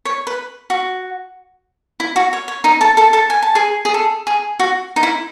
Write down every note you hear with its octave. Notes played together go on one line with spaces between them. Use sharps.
C#5
B4
F#4
E4
F#4
C#5
C#5
D#4 D#5
A4 A5
A4 A5
A4 A5
G#5
A5
G#4 G#5
G#4
A4
G#4
F#4
D#4
E4